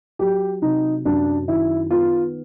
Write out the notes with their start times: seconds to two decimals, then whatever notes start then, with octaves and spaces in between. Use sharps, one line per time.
0.19 F#3 G4
0.62 C3 D#4
1.05 F#2 D4
1.48 D#3 E4
1.91 B3 F4